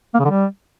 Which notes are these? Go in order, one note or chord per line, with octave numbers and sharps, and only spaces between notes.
A#3
C#3
D3
G3